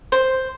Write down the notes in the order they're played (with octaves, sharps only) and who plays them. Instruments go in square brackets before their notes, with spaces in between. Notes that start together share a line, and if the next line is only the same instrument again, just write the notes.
[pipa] C5